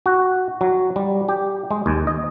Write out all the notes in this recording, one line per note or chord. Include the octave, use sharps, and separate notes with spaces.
F#4
F#3
G3
G4
G#3
D#2
D#5